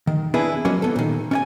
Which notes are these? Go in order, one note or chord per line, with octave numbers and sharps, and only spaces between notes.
D#3
B3 D4 E4 G#4 B4
F#3 G#3 A#3 C#4
B3 A4
A#2 D#3
C#4 D5 G#5